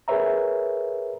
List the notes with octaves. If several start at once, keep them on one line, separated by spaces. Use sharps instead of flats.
G#4 A#4 B4 C#5 E5 A#5